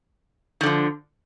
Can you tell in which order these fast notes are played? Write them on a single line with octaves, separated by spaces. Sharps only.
D#3 D3 F3